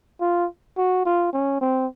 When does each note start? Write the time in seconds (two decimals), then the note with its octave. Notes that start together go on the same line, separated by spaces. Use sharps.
0.21 F4
0.77 F#4
1.06 F4
1.33 C#4
1.61 C4